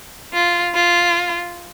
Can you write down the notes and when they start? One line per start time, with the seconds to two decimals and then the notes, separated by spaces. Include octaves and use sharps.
0.33 F4
0.74 F4